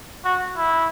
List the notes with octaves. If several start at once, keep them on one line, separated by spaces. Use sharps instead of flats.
F#4
E4